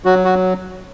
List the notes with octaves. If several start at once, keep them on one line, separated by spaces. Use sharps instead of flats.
F#3 F#4
F#4